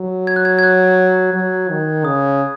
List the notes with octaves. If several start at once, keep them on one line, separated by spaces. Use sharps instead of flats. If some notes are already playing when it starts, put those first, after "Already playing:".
Already playing: F#3
G#6
F#6
G#6
G#6
F#6
F#3
D#3
C#3 D#6